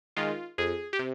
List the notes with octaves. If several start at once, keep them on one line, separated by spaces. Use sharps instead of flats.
D#3 G#3 F4
F2 G#4
G4
C3